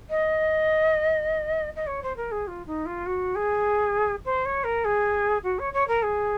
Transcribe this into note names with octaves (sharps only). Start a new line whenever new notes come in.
D#5
D#5
C#5
C5
A#4
G#4
F4
D#4
F4
F#4
G#4
C5
C#5
A#4
G#4
F#4
C#5
C#5
A#4
G#4